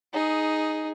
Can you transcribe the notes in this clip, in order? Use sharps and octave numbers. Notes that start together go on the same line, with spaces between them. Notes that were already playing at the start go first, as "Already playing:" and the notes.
D#4 G#4